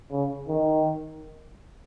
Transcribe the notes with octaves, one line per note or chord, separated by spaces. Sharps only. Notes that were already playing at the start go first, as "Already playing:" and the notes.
C#3
D#3